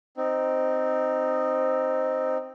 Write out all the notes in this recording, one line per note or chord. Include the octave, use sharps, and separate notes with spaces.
C4 D#4